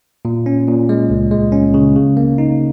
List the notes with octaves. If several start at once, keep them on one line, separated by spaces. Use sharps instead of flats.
A#2
C#4
A#2
G#3
C#2
G#3
C#4
C#3
C#3
A#3
D#4